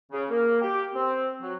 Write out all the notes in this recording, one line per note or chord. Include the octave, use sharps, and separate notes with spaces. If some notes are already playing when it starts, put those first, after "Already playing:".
C#3
A#3
G4
C4
F#3